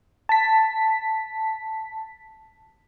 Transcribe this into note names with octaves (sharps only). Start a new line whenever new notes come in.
A5 B6